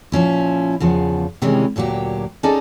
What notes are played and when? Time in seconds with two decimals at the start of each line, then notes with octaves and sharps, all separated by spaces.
0.12 A#2 F3 C#4 E4
0.80 E2 C#3 F3 B3
1.42 C3 D#3 E3 G3 G#3 C#4
1.76 D2 A#2 F#3 A#3 G4
2.43 C#4 D#4 G#4 A4 D5 D#5